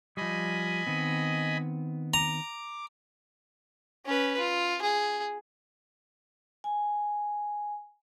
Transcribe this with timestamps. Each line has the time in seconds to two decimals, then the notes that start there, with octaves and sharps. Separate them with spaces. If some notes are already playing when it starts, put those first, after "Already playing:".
0.17 F3 G3 D#5 G#5 B5
0.87 D#3 B3 C4
2.14 A#5 D6
4.06 C#4 B4
4.39 F4
4.82 G#4
6.64 G#5